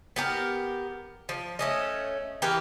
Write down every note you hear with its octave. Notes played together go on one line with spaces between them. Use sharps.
B3 G4 G#4 A#4
F3
A3 C#4 D#5
E3 G4 A#4 B4